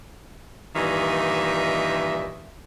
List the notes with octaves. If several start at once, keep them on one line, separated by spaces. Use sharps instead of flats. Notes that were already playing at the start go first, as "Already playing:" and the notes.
G2 A#2 D#3 E3 D#5 E5